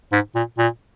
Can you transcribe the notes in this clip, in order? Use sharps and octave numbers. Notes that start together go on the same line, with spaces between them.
G#2
A#2
A#2